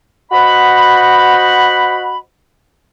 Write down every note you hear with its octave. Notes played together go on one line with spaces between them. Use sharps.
F#4 C5 D#5 F#5 B5